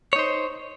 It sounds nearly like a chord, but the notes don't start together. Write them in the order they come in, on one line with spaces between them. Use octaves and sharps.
C#5 D#4 C5